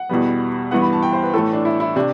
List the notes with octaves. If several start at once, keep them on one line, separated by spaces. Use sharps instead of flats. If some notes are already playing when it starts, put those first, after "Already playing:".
Already playing: F#5
E2 B2 G3 B3
G2 E3 B3 F#5
B5
A5
G5
C5
B4
A2 E3 A3 A4
D4
E4
E4
C3 D4